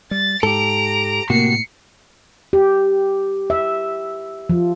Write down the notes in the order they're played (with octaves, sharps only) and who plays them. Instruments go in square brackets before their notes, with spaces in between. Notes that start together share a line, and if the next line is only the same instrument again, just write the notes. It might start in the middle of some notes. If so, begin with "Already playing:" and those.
[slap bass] G3 [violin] A6
[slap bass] G#2 [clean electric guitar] G4 A4 [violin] A#5 D7
[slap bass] A2 [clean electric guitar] C3 F#4 [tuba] A#3 [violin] C7 C#7
[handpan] G4
E5
F3